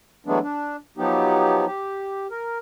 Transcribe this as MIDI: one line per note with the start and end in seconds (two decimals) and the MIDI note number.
0.27 0.39 52
0.27 0.39 54
0.27 0.39 56
0.27 0.39 57
0.27 0.39 59
0.27 0.39 62
0.43 0.76 62
0.98 1.66 53
0.98 1.66 54
0.98 1.66 59
0.98 1.66 63
0.98 1.66 67
1.67 2.27 67
2.31 2.58 70